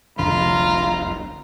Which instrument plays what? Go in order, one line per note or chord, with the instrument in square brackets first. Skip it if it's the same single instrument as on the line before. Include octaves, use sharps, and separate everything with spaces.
[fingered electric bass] F1 C2 D3 [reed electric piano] F2 B5 [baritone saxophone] F4 [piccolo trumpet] A#5